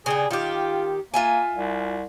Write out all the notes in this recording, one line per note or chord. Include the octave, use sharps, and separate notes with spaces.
C#3 D4 G4 G#4
D#3 F4 G4
A#3 F4 E5 G#5
C2